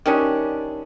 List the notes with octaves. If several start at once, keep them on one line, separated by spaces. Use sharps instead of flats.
D#3 G3 C#4 D4